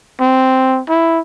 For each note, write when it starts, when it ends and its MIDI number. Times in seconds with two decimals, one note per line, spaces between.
0.21 0.81 60
0.89 1.19 64